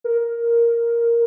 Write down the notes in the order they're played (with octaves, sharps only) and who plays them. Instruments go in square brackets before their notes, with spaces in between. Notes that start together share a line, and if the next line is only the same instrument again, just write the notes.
[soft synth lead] A#4